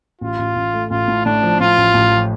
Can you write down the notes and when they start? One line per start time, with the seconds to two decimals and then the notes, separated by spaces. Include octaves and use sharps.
0.21 A1 F4
0.39 A1
0.56 A1
0.73 A3
0.91 A1 F4
1.08 A2
1.25 A2 D4
1.43 F3
1.60 A2 F4
1.78 A1
1.95 A1
2.12 F3